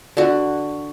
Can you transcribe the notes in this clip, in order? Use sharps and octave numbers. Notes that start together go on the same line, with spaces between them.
D3 F#4